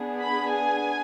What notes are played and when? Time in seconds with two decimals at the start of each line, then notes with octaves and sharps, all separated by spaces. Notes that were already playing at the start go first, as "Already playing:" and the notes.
Already playing: B3 D4 G#4
0.20 B5
0.51 G#5